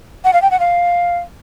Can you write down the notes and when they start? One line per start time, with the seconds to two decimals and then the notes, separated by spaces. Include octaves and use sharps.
0.25 F#5
0.33 F5
0.42 G5
0.51 F#5
0.60 F5